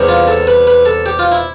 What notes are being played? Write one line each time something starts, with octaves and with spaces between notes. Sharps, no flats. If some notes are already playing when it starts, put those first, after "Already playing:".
Already playing: E2 C3 G3
F4
A4
B4
B4
A4
G4
F4
E4